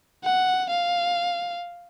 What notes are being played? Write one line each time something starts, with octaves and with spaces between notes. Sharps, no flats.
F#5
F5